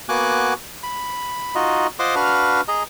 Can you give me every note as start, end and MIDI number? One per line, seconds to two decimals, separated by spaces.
0.09 0.54 58
0.09 0.54 59
0.09 0.54 66
0.09 0.54 80
0.09 0.54 86
0.09 0.54 90
0.83 1.55 83
1.55 1.87 63
1.55 1.87 65
1.55 1.87 66
1.55 1.87 75
1.99 2.15 65
1.99 2.15 72
1.99 2.15 75
1.99 2.15 78
1.99 2.15 84
1.99 2.15 86
2.15 2.61 62
2.15 2.61 66
2.15 2.61 71
2.15 2.61 77
2.15 2.61 89
2.68 2.83 68
2.68 2.83 75
2.68 2.83 82